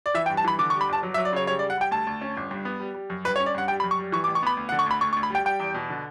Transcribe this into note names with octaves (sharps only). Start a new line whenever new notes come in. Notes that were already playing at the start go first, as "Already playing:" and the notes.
D5
E3 E5
G5
G2
A5
E3 B5
D3 D6
C#6
G3
B5
G1 A5
F#3
E5
F#3
D5
C#3 C#5
G3 C#5
D5
G3
F#5
G3 G5
D2 A5
D2
C#4
G1
G2
B3
G3
G3
F#2
G2 B4
C#5
C#4
D5
G2 F#5
G3 G5
B5
F#2
C#6
G3
E3 C#6
D6
A1
C#6
B3 B5
D2
F#5
D3
C#6
D2 B5
D2 C#6
C#6
D2
B5
G3 G5
G3 G5
E2
B2
D3